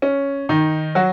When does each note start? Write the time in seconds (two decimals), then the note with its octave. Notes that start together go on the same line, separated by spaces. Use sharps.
0.02 C#4
0.49 D#3 D#4
0.95 F#3 F#4